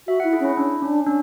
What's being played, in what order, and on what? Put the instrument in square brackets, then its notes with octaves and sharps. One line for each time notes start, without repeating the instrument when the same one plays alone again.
[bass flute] F#4 [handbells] E5
[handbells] F#5
[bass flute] E4
[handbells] G#4
[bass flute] C#4 [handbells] E4
[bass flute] C#4 [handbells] D4
[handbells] C#4 [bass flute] D4
[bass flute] C#4 [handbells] D4